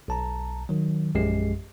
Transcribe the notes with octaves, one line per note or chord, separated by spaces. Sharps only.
B1 A5 A#5
D#3 F#3
A#1 F#2 G#3 G4 C7